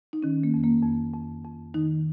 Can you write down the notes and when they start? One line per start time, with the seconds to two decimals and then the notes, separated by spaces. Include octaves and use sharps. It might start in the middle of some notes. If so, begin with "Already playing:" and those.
0.13 D#4
0.22 D#3 C#4
0.43 A#3
0.54 F2
0.64 A#3
0.83 F2
1.14 F2
1.45 F2
1.74 D#3 D#4